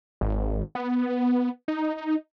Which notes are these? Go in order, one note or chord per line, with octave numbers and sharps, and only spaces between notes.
G#1
B3
D#4